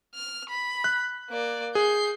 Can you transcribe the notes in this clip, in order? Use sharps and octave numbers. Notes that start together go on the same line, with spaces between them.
F6
B5
F#6
A#3 D5
G#4 G6 C7